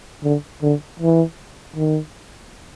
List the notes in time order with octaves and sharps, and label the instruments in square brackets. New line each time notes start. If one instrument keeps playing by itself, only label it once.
[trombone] D3
D3
E3
D#3